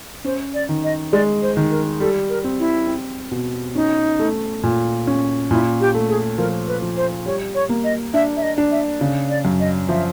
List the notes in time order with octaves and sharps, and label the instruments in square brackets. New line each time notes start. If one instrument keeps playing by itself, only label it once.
[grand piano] C#4 [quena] C5
[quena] D5
[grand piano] D#3
[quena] D#5
[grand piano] G#3 [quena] D5
[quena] C5
[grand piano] D#3
[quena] A#4
[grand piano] G3 [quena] A4
[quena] A#4
[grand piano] C4
[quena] E4
[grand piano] C4
B2
[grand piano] C#4 [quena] D#4
[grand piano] A3
A#2
C#4
[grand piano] A#2 [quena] E4
[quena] G4
[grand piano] A3
[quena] G#4
[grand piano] F3 [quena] A#4
[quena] B4
[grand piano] F3
[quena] C5
[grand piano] G3 [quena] C#5
[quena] C#5
[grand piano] A#3
[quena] D#5
[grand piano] D4 [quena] E5
[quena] E5
D#5
[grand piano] D4
[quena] E5
[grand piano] C#3
[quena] D5
[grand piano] F#2
[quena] D#5
[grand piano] F3 [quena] E5